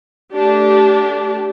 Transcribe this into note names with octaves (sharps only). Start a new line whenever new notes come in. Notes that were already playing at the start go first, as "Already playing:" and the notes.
A3 D4 G4